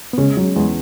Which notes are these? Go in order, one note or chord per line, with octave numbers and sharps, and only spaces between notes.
B3
C#3 G#3 C#4
F#3 C#4
E2 G#3